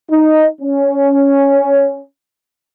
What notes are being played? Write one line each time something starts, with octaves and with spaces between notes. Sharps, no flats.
D#4
C#4